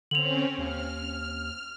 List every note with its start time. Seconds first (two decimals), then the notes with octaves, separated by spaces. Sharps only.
0.11 D3 C4 C#4 F7 F#7
0.58 D#2 F6